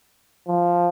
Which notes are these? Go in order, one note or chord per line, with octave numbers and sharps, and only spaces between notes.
F3